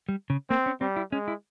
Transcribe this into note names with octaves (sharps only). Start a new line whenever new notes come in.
G3
C#3
A#3 C4
C#4
G3 C4
E4
G#3 C#4
E4